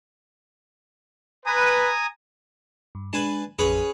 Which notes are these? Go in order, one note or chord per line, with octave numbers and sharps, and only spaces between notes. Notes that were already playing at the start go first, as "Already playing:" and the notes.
B4 G#5 A#5 D#6
G2
G#3 D4 B4 G#5 A5
A1 F2 C#4 G#4 B4